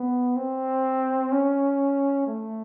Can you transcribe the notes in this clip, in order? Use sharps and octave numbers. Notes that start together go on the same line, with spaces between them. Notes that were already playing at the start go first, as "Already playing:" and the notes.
Already playing: B3
C4
C#4
A3